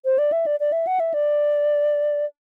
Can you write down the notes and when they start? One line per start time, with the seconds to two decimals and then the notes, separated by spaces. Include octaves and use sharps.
0.05 C5
0.18 D5
0.32 E5
0.46 D5
0.60 D5
0.72 E5
0.87 F#5
1.00 E5
1.14 D5